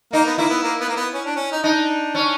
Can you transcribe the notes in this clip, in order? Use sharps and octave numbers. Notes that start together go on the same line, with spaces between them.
A#3 D#4
B3
A#3 E4
B3
A#3
B3
A#3
B3
C#4
D4
C#4
D#4
D4 D#4
C#4